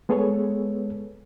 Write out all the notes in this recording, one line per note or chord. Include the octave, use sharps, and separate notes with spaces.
G#3 B3 G#4 A4 B4 C#5